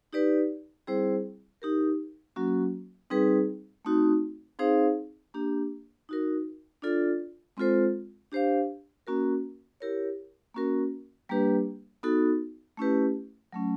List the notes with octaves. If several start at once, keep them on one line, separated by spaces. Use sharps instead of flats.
D#4 G4 B4 D5
G3 C4 E4 G#4 C5
D#4 G4 A#4
F#3 A#3 C#4 F#4
G3 C4 D#4 G#4 B4
A3 C4 D#4 F#4
C4 D#4 G#4 C5 F5
A#3 D4 G4
D#4 F#4 A#4
D4 F4 A4 D5
G#3 C4 F4 A4 C5
D4 G4 C5 F5
A#3 C#4 F#4 A#4
E4 G4 A#4 C#5
A#3 C#4 F#4 A#4
G3 A#3 D4 G4 B4
B3 D#4 F#4 A4
A3 C#4 E4 G4 B4
F#3 A3 C#4